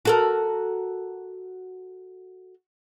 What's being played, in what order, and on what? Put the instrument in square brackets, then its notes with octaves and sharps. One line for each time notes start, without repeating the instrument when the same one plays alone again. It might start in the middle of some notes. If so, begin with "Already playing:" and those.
[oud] F#4 A4 A#4